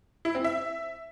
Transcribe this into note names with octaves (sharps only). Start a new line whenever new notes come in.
E4
C4
E5